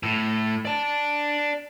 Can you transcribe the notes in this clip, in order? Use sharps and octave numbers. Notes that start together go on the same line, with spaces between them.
A2
D5 A5